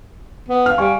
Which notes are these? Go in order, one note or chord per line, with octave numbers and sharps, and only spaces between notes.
B3
F5 F6
G3 F5 G#5 C#6